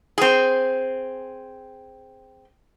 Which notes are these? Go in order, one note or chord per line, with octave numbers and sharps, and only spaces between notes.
C4 G#4